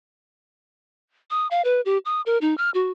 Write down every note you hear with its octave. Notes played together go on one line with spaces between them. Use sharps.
D#6
F5
B4
G4
D#6
A#4
D#4
F6
F#4